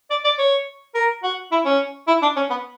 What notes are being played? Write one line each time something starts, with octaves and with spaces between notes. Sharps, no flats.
D5
D5
C#5
A#4
F#4
E4
C#4
E4
D4
C#4
B3